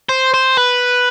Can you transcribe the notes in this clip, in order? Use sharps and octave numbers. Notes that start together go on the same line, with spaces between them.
C5
C5
B4